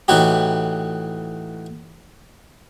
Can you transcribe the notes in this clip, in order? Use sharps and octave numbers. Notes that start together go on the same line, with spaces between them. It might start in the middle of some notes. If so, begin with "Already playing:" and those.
A2 E3 D#4 F#4 G4